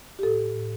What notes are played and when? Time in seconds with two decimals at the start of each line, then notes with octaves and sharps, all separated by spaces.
0.19 G4
0.23 A2 A4
0.54 A2